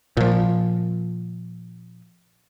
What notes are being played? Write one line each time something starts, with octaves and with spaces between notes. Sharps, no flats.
A#2 F3